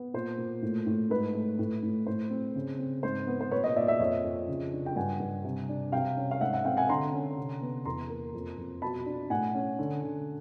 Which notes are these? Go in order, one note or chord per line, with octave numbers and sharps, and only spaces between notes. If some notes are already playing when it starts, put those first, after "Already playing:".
Already playing: B3
A#2 C5
A#2
A2
A2
G#2 B4
A3
A2
A2
A2 C5
C4
C#3
C4
G#2 C5
B3
C5
A#2 B4 C#5
C#5 D#5
A#2 D5 E5
D5 E5
F2 C#5 D#5
F2
C#3
D4
G5
G2 F#5 G#5
G2
C3
D4
C3 F5 G5
C#4
F5
G#2 E5 F#5
E5 F#5
C4 F5 G5
F#5 G#5
D3 A#5 C6
C#4
C3
B3
E2 A#5 C6
A#3
F2
F2
B2 A5 B5
D4
A2 F#5 G#5
C#4
D3
D3